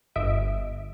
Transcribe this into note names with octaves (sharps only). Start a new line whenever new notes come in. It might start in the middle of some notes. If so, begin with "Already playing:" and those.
G1 D#5 E5 D7